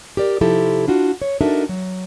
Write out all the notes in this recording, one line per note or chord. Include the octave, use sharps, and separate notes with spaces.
G4 A#4 D5
C3 F3 D#4 E4 G4 A4
D4 F4 F#4
C#5
D4 D#4 F#4 A4 A#4 E5
F#3